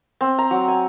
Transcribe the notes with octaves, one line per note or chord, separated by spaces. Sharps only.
C4
A#5
F#3
G#5